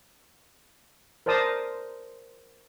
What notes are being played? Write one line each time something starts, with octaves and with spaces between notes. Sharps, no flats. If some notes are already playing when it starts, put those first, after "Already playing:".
A#4 C5 D5 A5 D#6